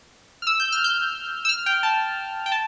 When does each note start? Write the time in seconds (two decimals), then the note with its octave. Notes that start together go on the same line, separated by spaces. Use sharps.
0.42 F6
0.47 E6
0.60 G6
0.72 F6
0.84 G6
1.45 E6
1.49 F6
1.66 G5
1.83 A5
2.46 G5
2.52 A5